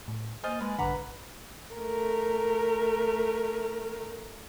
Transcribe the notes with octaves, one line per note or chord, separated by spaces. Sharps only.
A2
A#3 C5 D#5 G#5 F6 A6
G#3 B4
A#1 G2 D3 B4 F#5 A#5 B5 D6
A3 A#4